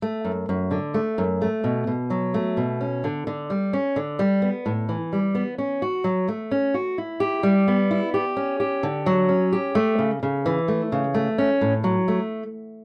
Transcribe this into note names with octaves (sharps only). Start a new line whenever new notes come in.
A3
F#2
F#2
D3
A3
F#2
A3
B2
B2
F#3
A3
B2
C#4
D3
D3
G3
C#4
D3
G3
B3
A2
E3
G3
B3
C#4
F#4
F#3
A3
C#4
F#4
E4
G4
G3
B3
E4
G4
C#4
G4
D3
F#3
C#4
G4
A3
C#3
C#3
E3
A3
C#3
A3
C#4
A2
F#3
A3